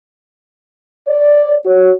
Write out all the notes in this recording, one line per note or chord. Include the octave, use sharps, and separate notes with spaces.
C#5 D5
F#4 C#5